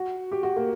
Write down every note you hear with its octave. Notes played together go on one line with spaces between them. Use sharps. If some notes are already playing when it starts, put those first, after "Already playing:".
Already playing: F#4
G4
F#4
A#3